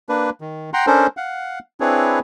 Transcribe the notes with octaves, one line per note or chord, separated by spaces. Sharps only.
A#3 D4 B4
D#3
F#5 G5 A#5 C6
C#4 D4 A4 A#4 C5
F5 F#5
C4 D4 E4 G#4 B4 C#5